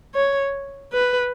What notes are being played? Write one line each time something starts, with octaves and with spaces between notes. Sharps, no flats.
C#5
B4